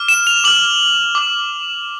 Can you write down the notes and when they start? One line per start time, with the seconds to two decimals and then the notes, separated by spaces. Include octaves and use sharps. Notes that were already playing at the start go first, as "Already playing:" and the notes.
Already playing: D6 F6
0.08 E7
0.27 F7
0.44 D6 F6 F#7
1.15 D6 F6